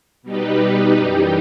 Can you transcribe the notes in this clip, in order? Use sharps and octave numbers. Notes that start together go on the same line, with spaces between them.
B2 G3 D#4 G4 B4
F#2 E3 G3 D#4 G4